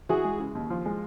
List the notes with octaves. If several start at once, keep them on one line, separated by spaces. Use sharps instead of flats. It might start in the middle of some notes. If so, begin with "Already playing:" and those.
E3 F#4 G#4
G#3
C#3
D#2
F3
G#3